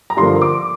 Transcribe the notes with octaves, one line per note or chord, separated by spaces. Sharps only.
A#5
G2 D3 F3 A#3 C6
D6